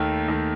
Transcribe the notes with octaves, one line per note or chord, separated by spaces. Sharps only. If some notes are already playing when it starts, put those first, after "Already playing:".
Already playing: D#2 D#3 A3
D#2 D#3 A3